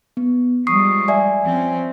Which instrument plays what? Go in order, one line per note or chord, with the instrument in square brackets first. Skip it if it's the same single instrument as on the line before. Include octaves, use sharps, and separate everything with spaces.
[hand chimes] B3
[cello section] F3 G3 G#3 [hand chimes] C#6 D#6 C7
[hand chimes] D5 E5 G#5
[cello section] F3 C4 C#4